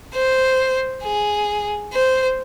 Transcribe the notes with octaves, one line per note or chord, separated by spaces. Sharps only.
C5
G#4
C5